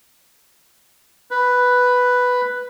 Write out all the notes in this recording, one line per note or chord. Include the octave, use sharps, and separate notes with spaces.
B4